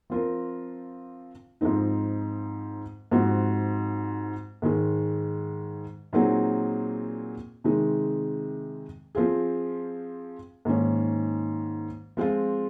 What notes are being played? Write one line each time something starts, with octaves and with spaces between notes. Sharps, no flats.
F3 C4 F4 A#4
G#2 F3 C4 D#4
G#2 F3 C4 F#4
G#2 D#3 G#3
A#2 F#3 C4 D#4 G#4
C3 D#3 G#3 C4 D#4
F3 C4 F4 G#4
G#2 D#3 A#3 C#4
F3 G#3 C4 F4